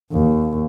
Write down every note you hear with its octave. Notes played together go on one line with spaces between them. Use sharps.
D#2